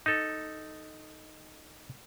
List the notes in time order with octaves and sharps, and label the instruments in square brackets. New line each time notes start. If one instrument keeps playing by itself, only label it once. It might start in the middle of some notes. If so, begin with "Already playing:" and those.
[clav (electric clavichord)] D#4 A4